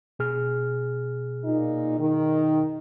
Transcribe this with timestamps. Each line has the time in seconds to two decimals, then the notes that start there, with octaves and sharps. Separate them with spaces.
0.19 B2 G#4 F6
1.43 A#2 D#4
1.99 D#3